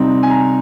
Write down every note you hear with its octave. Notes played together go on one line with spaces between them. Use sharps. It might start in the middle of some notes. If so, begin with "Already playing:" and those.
Already playing: C3 G3 C4 D#4
G#5
A#5